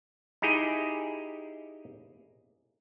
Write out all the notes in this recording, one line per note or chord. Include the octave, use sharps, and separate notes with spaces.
D#4 E4 G4 G#4 G5